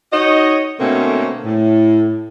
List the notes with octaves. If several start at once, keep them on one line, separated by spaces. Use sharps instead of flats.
D#4 F#4 C#5 D#5
B2 D3 A3 A#3 C4 C#4
A2